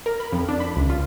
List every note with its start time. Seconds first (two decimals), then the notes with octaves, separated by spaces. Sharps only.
0.06 A#4
0.20 B5
0.32 F2
0.49 D4
0.60 B5
0.76 C#2
0.90 F4